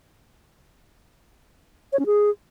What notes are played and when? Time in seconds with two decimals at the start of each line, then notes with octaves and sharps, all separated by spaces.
1.93 C#5
1.99 C#4
2.06 G#4